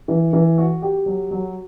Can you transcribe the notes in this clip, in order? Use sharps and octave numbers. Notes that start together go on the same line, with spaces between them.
E3
E3
F#4
G4
F#3
F#3